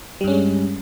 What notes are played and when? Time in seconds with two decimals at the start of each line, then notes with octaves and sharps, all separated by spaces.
0.21 G3
0.24 G2
0.27 C#4
0.31 G#3